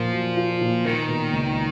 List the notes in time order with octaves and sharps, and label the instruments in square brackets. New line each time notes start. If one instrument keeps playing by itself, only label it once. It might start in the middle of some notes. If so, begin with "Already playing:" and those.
Already playing: [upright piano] A#2 A#3 [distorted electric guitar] F3
[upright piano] F#3
F4
A#2
[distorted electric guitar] D#3 [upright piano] A#3
[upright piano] B2
C#2